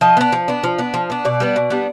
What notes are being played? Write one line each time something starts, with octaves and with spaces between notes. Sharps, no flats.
F3 D#5
B3 D4
F3
B3 D4
F3
B3 D4
F3
B3 D4
B2 D5
G3 B3 D4
B2
G3 B3 D4